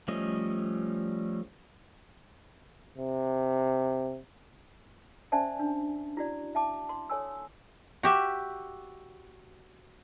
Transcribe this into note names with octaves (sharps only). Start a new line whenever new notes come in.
F3 G3 A3 C#4 D#5
C3
C#4 C5 D5 E5 G#5 A5
D4
E4 F#4 D5
E5 A5 D6
C6
A4 C#5 G#5 E6
F#4 G4 E5